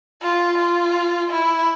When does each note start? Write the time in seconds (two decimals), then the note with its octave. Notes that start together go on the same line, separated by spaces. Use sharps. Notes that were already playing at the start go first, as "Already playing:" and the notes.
0.22 F4
0.58 F4
1.30 E4